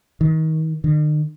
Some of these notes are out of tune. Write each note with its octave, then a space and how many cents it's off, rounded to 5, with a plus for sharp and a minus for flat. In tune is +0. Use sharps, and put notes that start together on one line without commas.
D#3 +30
D#3 -45